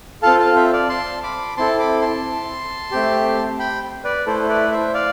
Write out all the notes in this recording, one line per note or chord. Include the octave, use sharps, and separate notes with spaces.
C4 F4 A4 F5 A5
F5 A5
C5 E5
D5 F5
A5 C6
B5 D6
C4 E4 A4 A5 C6
B5 D6
A5 C6
A3 C4 G4
G5 B5
B4 D5
A3 E4 A4 C5
B4 D5
C5 E5
D5 F5